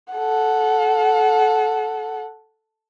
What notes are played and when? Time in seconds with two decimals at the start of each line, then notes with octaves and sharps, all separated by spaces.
0.14 A4 F#5